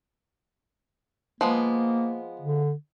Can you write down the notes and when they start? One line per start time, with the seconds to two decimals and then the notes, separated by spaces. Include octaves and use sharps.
1.41 F3 G#3 A#3 B3
2.41 D3